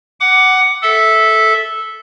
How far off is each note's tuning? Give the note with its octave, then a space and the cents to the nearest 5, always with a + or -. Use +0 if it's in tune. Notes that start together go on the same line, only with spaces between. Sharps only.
F#5 +15 D6 +0
A4 -10 E5 -10